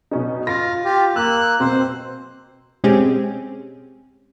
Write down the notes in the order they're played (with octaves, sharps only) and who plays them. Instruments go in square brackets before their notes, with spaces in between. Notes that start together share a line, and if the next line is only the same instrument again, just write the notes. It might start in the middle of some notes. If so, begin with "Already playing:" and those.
[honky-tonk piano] B2 C#4 D#4
[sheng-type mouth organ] F4 [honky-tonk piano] A#6
[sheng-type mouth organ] F4 G4
[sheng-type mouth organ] A#3 F#6 [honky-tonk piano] E6
[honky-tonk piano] B2 C4 [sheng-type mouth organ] C5
[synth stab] B2 G#3 C4 C#4 G4 G#4